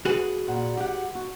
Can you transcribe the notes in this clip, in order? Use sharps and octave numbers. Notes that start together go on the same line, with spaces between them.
F#4 G#4 B4
A#2 F#5
G4 F#5
F#4